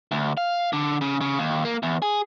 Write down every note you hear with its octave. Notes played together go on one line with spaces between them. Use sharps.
D2
F5
D3
C#3
C#3
D#2
A#3
E2
G#4